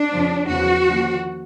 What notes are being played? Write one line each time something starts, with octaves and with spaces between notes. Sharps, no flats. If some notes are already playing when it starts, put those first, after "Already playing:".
Already playing: D4
F2 C#3 F3
E2 C#3 F3 F#4
D#2 D3 F3